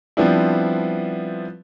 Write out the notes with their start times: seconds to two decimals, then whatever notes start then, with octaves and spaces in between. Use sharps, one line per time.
0.17 F3 G3 B3 C4 D4 E4